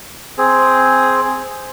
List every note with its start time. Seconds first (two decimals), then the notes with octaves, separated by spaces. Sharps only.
0.38 C4 G#4